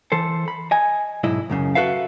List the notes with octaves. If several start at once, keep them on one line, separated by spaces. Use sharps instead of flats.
E3 A4 C5
B5
D#5 G#5
B1 G#2 E4 D#5
C#2 F#2 C#3
F#4 A4 B4 E5 F5